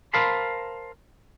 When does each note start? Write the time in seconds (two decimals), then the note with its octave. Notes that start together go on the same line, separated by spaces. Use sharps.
0.14 A#4 C5 F5 A5 B5 C6